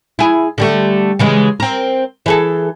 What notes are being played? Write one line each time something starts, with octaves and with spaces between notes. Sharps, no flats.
E4 G#4
D3 G3 A3
C#3 E3 G#3
C4 A#4
E3 G#4 A4